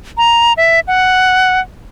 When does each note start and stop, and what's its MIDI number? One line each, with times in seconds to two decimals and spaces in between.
0.17 0.53 82
0.57 0.80 76
0.87 1.59 78